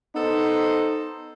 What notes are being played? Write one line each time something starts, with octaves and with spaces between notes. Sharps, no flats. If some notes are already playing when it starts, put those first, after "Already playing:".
B3 D#4 A4 C5